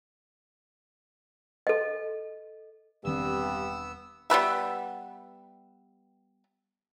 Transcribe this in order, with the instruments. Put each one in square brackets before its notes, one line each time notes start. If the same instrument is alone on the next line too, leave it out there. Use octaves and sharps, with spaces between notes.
[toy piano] A4 D#5
[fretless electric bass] E1 D#3 C4 [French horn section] G2 G4 [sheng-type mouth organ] B3 E6
[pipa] G3 B3 B4 E5